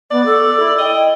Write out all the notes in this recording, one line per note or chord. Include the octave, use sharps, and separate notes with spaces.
B3 D5
A4
E4
D#5 G5